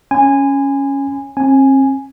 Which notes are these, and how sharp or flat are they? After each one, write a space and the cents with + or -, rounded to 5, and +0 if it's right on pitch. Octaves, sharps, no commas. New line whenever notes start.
C#4 +0 G#5 -15 B5 +45
C4 +45 G#5 +0